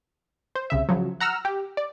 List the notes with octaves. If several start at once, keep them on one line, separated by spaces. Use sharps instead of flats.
C5
C2 C#3 E5
C#3 F3 F#3
F#5 A#5 E6 F6
G4
D5